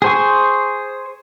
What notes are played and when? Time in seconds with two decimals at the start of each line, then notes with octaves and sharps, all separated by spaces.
0.02 G#4 C5 C#6